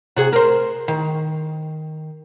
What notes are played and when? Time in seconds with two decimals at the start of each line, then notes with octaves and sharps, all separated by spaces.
0.16 C3 F#4 G#4
0.33 A#4 C5
0.88 D#3